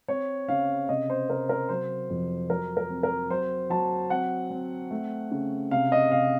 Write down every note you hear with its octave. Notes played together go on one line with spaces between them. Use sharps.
C4 C#5
C#3 F5
C3 D#5
C5
C3 A#4
A#4
F#3 C5
F2
F#3 A#4
A#4
C4
A#4
F#3 C5
F#3 A5
C4 F#5
C4
A3
C#3
C3 F5
D#5
C3 F5